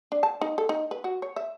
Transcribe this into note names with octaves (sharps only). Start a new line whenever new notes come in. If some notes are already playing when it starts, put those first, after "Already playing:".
D4
A5
D#4
A4
D#4
B4
F#4
C#5
E5